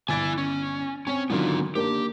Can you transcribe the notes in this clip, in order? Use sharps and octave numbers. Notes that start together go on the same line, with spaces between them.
G1 E4 G#5 A6 D7
C#4
C4 C#4 C#5
D3 D#3 F#3 B3 F4
A#3 D4 G4 A#4